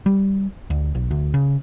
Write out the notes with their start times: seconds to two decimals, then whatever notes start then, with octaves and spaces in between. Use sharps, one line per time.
0.06 G3
0.70 D2
0.95 B1
1.11 D2
1.34 C#3